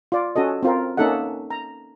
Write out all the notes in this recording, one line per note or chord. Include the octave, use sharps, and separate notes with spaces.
F4 D5
C#4 F#4 A4 D#5
C4 F4 A#4
A#3 C#4 D#4 A4 E5 F#5
A#5